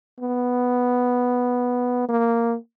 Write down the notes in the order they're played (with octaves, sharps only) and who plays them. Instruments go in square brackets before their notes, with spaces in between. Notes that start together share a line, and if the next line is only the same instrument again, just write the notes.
[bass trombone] B3
A#3